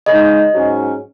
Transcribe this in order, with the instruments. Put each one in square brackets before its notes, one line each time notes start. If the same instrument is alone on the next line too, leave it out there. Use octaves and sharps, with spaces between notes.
[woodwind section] C#3 G#3 D#4 [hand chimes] D#5
[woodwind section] G#2 F#3 C#4